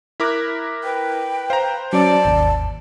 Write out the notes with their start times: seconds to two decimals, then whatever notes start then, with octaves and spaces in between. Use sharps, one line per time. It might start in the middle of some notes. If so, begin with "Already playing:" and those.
0.20 E4 A#4 D6 F#6 A#6 B6
0.84 B4 G5
1.50 C5 F5 A#5
1.93 F#3 C#4 D5 A5
2.25 G#1 D#2